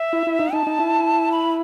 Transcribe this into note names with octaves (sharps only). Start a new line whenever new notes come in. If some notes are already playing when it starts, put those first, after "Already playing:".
Already playing: E5
E4
E4
D#4
D#4 A5
D#4
E4
B5